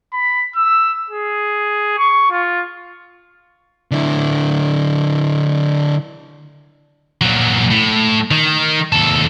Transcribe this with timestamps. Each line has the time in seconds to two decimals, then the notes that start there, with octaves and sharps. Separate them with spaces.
0.13 B5
0.56 E6
1.11 G#4
1.98 C#6
2.31 F4
3.91 D3 E4
7.21 A#2 F#3
7.71 A2
8.31 D#3
8.92 D#2 A4